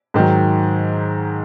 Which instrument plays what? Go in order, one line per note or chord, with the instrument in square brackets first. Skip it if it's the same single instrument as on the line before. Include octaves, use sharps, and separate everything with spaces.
[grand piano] G#2 D#3 F#3